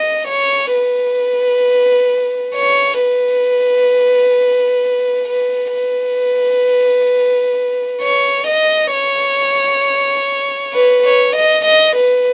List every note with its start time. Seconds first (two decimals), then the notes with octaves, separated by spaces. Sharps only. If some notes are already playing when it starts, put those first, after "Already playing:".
Already playing: D#5
0.28 C#5
0.74 B4
2.55 C#5
3.01 B4
5.29 B4
5.74 B4
8.02 C#5
8.47 D#5
8.93 C#5
10.74 B4
11.05 C#5
11.36 D#5
11.65 D#5
11.96 B4